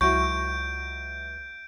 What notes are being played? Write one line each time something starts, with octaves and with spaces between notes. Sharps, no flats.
C#2 F#3 E4 F#4 C#6 G6 D7